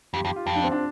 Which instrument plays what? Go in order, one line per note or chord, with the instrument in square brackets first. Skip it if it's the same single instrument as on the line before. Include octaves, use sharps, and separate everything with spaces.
[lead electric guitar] F2 [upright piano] G4
[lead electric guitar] F2 [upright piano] G4
[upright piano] F4
[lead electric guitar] F2
[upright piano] D4
C4
D4